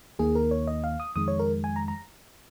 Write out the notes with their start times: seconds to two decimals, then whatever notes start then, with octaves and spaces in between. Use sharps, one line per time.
0.19 D#2 D#3 A#3 G#4
0.35 A#4
0.51 C#5
0.67 D#5
0.84 F5
1.00 D#6
1.16 F2 D#3 G#3 D#6
1.28 C#5
1.39 A#4
1.64 G#5
1.76 A#5
1.88 A#5